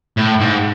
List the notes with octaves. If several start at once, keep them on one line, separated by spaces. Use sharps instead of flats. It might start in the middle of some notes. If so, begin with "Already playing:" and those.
A2
G#2